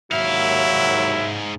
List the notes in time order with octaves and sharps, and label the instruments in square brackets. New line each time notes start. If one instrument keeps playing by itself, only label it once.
[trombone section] D#2 F#3 [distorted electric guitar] G#2 F5 [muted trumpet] E4 [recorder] E5